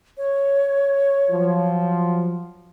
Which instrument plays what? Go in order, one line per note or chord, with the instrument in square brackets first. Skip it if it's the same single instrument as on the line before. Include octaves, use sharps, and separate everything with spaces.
[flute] C#5
[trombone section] F3 F#3